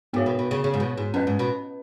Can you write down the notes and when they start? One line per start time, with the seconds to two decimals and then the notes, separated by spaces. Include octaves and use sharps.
0.13 G#2 B3 F#4 C#5
0.26 B2
0.39 B2
0.51 C#3
0.64 C#3
0.74 G#2
0.80 B2
0.98 G#2
1.14 F#2 C#4 B4 D#5
1.27 G#2
1.39 B2